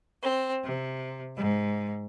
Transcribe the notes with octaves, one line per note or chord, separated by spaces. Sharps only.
C4
C3
G#2